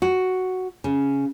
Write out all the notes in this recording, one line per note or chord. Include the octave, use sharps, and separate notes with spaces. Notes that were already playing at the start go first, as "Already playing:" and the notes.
F#4
C#3